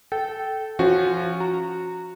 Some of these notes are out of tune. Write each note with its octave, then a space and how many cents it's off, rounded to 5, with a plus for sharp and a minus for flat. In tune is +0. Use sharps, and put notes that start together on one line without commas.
A4 -10 G5 -20
F3 -25 C#4 -5 F#4 -5
F#4 -15 A#5 -20